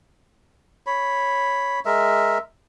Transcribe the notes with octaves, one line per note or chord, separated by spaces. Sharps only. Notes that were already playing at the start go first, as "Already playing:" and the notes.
C#5 B5
G#3 A#4 E5